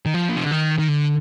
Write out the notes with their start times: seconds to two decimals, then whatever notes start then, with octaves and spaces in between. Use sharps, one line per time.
0.06 D#3
0.14 F3
0.29 A#2
0.37 C3
0.45 D3
0.52 D#3
0.79 D#3
0.88 D3